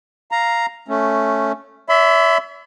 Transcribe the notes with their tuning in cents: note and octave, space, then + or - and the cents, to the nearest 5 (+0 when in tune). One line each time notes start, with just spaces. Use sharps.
F5 -5 A#5 +0
A3 +0 C#4 +0
C#5 +45 E5 +0 B5 +40